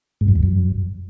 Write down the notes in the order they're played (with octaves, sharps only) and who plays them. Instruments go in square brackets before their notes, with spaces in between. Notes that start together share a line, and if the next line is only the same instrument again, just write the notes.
[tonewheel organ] G#2
F#2
E2
F#2